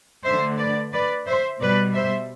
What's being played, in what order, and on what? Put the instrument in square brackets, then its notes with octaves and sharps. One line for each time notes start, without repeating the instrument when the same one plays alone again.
[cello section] D3 A3 C5 E5
B4 D5
B4 D5
C5 E5
B2 G3 B4 D5
C5 E5